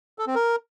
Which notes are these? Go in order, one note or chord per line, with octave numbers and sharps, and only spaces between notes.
A4
C4
A#4